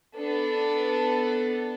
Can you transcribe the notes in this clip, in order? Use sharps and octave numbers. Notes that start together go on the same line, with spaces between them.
B3 D4 A4